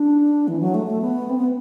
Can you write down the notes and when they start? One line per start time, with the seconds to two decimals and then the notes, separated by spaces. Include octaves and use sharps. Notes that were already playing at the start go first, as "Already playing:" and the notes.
Already playing: D4
0.48 E3
0.60 F#3
0.74 A3
0.87 A3
1.01 B3
1.30 C4
1.38 B3